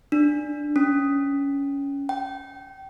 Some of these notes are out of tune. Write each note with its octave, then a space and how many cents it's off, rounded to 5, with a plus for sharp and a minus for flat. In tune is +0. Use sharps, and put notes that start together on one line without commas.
D4 +5
C#4 +15
G5 -25